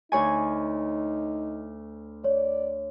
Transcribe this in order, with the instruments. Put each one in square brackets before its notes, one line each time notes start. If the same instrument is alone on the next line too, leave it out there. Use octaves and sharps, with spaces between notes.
[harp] D2 C#5 G#5 [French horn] D#4
[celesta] C#5 [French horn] D5